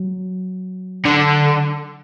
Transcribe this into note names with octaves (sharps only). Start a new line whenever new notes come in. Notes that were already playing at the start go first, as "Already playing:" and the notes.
Already playing: F#3
D3